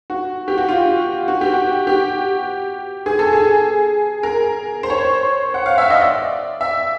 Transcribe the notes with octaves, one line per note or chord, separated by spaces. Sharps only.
F#4
G4
F#4
F4
F#4
G4
F#4
G4
G#4
A4
G#4
A#4
C5
C#5
C5
F#5
F5
E5
D#5
D5
E5